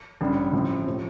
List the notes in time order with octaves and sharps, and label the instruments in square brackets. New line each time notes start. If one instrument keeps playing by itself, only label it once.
[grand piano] A1 G2 D3 G3
A1 A2 F3 C4
C3 F3 A3